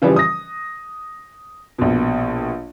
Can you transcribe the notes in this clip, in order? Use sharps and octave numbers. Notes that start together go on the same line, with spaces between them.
C#3 E3 F3 G3
D#6 A#6
A#1 B2